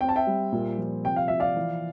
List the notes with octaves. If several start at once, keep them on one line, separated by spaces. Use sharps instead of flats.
C4 G5
A5
E5 G5
G3
A#2
F3
C3 G5
F5
F3 E5
D5 F5
E3